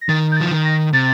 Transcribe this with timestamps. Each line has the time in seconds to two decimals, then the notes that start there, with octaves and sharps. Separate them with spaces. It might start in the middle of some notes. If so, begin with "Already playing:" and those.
0.01 A#6
0.09 D#3 A6
0.32 G6
0.37 A6
0.41 F3
0.51 D#3
0.65 A#6
0.93 C3 A6